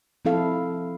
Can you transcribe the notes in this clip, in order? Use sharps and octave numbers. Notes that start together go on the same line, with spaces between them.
F3 C4 E4 A4 F5